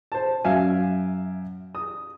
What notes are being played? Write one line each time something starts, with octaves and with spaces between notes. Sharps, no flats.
C5 A5
F#2 E5 F5 G#5
D#6